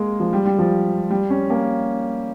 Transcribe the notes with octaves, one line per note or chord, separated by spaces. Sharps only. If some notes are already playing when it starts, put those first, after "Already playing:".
Already playing: G#3 A#3
F3
G3
G3
F3
G3
C#4
A#3